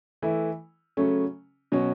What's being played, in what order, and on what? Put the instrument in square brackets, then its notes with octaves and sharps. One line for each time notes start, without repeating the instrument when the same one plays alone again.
[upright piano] E3 A3 E4
C#3 F#3 A3 C#4
B2 F#3 C#4